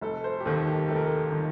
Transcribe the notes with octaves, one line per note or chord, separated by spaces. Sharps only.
F1 A4
C5
G4
D#2 D#3 A4
G4
F1 A4
A#4
A4
D#3